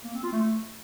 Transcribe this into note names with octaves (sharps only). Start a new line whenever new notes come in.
A#3
C4
F4
A3